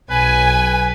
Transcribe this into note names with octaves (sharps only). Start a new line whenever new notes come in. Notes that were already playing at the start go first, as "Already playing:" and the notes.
B1 B4 G#5